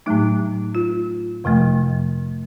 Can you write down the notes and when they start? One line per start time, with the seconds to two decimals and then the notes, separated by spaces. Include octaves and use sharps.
0.06 A2 F#3 A3 D#4
0.75 F4
1.44 F2 C3 F3 A3